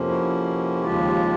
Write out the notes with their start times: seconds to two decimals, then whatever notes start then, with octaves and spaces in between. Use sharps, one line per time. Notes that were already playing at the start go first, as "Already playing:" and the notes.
Already playing: F2 C3 F3 A#3 C#4
0.08 E4 F#4
0.84 D#2 C#3 F3 G#3 F4 G4